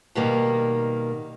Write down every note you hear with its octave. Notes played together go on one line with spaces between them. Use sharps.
B2 D#3 G3 A#3